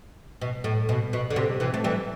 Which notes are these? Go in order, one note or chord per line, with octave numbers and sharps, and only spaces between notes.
B2
A2
B2
B2
D3
C3
C3 E3
A3
E3 G3